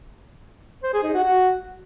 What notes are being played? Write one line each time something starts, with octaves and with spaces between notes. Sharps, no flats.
C5
G#4
D#4
F#4
F#4